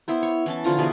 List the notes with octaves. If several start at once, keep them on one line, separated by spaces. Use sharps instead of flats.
B3 E4 C5
C#5
E3 C#4 A5
D3 F3 F4 A#5
B2 E3 G#4